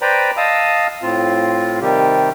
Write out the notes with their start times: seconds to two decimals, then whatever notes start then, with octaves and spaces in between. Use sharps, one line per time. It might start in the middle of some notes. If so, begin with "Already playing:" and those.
0.02 B4 C5 D5 G5 A#5 B5
0.37 D#5 F5 A5 D#6 E6
1.02 A2 C4 F4
1.81 C3 D#3 G3 G4